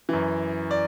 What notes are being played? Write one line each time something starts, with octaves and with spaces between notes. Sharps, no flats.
F#2 E3
D5